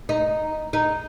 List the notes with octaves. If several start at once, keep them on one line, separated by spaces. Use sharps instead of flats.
D#4
D#4